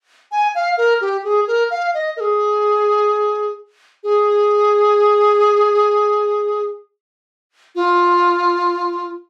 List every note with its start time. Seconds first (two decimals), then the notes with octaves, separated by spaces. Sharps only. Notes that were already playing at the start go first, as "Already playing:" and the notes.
0.32 G#5
0.55 F5
0.78 A#4
1.01 G4
1.24 G#4
1.47 A#4
1.70 F5
1.94 D#5
2.17 A#4
2.20 G#4
4.04 G#4
7.75 F4